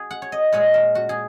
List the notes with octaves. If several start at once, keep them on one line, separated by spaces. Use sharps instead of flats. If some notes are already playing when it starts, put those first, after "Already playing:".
Already playing: F#4 G#4
F#5
C#5
D#5
A#2 G#3 C#5
A#4
F#4
G#4